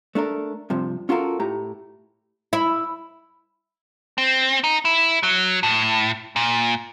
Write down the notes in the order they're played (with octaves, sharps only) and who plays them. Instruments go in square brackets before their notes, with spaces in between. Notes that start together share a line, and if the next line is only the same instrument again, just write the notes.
[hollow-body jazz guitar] A3 D4 A4 A#4
G2 C3 F3
C#4 F4 F#4 A4 A#4
A2 G4 A#5
[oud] E4
[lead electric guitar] C4
D#4
E4
F#3
A2
A#2